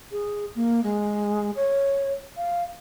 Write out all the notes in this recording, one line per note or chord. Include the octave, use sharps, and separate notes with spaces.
G#4
A#3
G#3
C#5
F5